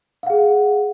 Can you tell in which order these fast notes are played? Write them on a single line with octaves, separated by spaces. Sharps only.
F5 F#5 G#4